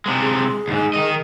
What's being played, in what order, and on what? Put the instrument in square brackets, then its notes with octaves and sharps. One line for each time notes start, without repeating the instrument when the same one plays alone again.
[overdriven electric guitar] C3 G#3
[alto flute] G#4
[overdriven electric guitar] D2 G#2
D#3 D#5